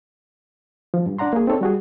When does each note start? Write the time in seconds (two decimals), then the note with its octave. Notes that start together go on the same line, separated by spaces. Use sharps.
0.94 F3
1.06 G2
1.18 D4 D5 F#5 A#5 C6
1.33 A#3 G#4
1.47 C4 D#4 A4 C#5
1.61 G3 F#4 G#4